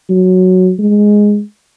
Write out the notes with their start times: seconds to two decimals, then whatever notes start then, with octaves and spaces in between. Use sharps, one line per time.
0.09 F#3
0.79 G#3